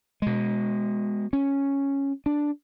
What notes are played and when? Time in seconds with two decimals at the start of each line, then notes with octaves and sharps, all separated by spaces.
0.22 B2 G#3
1.33 C#4
2.26 D4